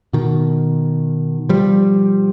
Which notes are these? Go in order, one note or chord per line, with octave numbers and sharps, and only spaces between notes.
B2 D#3
F3 G3